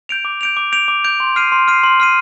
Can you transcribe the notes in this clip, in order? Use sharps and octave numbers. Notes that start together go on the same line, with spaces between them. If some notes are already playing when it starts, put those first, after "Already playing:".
G6 D7 F7
D6
G6 D7 F7
D6
G6 D7 F7
D6
G6 D7 F7
C6
F6 C7 D#7
C6
F6 C7 D#7
C6
F6 C7 D#7